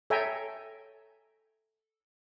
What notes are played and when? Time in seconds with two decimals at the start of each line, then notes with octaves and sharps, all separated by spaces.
0.10 A4 C#5 E5 G5 G#5 A#5